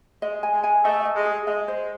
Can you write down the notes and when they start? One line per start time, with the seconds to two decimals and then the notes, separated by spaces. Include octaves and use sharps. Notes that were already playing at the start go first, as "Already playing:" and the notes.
0.22 G#3 D#5
0.43 G#5
0.53 G#3
0.64 G#5
0.84 A3 D#5
1.05 D#5
1.15 G#3
1.26 G#4
1.47 G#3 D#5
1.68 C5